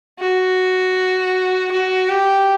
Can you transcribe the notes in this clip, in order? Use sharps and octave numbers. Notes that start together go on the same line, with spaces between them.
F#4
F#4
G4